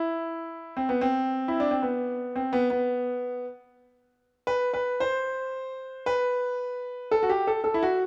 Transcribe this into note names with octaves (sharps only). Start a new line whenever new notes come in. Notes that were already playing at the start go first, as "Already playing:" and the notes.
Already playing: E4
C4
B3
C4
E4
D4
C4
B3
C4
B3
B3
B4
B4
C5
B4
A4
F#4
G4
A4
A4
E4
F#4